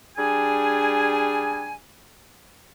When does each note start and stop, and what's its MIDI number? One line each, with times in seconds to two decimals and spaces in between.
0.17 1.74 55
0.17 1.74 62
0.17 1.74 68
0.17 1.74 80